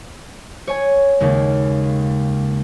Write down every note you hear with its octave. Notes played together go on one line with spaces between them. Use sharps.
C#5 G#5
D#2 C#3 G#3